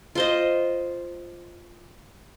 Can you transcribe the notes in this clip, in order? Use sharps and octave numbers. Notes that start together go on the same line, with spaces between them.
F4 C5 D#5